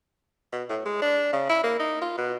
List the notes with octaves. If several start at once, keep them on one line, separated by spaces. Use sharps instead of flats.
B2
A2
G#3
D4
C#3
E4
A#3
D#4
F4
B2